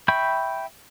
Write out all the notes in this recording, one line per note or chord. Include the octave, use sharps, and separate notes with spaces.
E5 G5 B5 C#6 G6